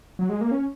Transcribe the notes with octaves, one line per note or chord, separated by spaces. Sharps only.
F#3
G#3
A#3
C#4